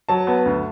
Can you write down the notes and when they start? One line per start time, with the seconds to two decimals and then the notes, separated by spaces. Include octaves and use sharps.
0.09 F#3 A5
0.27 B3
0.46 D2